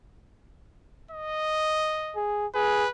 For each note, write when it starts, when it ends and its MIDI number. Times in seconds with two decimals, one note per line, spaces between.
1.11 2.21 75
2.16 2.47 68
2.55 2.85 68
2.55 2.89 71